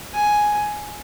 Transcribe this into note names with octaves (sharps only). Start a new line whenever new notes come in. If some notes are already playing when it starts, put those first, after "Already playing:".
G#5